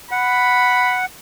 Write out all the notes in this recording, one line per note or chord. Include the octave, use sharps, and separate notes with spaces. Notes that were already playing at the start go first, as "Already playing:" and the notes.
F#5 B5